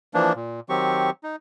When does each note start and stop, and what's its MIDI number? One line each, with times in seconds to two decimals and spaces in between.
0.14 0.33 52
0.14 0.33 53
0.14 0.33 58
0.14 0.33 62
0.36 0.60 46
0.69 1.10 51
0.69 1.10 54
0.69 1.10 60
0.69 1.10 67
0.69 1.10 85
1.23 1.36 63